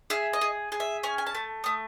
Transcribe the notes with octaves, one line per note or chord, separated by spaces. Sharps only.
G#4 E5
D#5
G#4
G#4
E5
C#4 G#5
G#5
A5
A3
A3 D#6